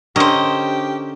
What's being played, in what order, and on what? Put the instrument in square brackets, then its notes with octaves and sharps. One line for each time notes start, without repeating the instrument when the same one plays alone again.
[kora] D3 C#4 A#4 [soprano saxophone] G4 [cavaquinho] C5 D#5